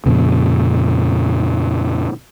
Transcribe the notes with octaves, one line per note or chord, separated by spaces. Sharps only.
F2 A#2 C#3